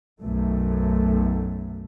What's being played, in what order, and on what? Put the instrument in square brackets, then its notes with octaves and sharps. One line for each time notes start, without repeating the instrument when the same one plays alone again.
[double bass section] B1 F#2 A3